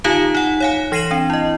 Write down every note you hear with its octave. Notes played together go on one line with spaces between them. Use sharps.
D3 D#4 F4 F5 A5
D#4 F#5
C#5 F5 G#5
E3 A#6 C7 D#7 E7 F#7
C4 D4
E4 D#5